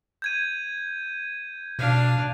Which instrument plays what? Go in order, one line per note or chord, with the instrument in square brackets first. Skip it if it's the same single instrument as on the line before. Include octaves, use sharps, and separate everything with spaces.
[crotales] G6 G#6 D#7
[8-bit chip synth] B2 [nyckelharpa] D4 F5